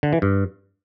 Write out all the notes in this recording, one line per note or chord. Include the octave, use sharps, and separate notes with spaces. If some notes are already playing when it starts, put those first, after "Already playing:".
D3
E3
G2